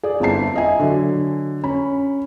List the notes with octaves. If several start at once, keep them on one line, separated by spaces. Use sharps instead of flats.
G#4 D5
G1 C4 E4 A5 C7
D#5 E5 G#5
D3 F#3
C#4 B5